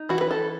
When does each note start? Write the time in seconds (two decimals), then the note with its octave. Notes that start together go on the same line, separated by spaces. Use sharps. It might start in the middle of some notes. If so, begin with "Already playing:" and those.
Already playing: D#4
0.09 E3 F#4
0.21 B4
0.31 A4